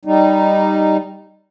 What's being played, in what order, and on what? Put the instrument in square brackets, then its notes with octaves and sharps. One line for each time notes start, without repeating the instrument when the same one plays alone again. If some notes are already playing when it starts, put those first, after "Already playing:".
[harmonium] G3 D#4